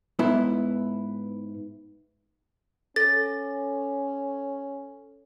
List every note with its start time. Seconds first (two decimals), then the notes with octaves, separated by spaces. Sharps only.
0.19 G#2 B3 E4
2.96 C#4 A4 A6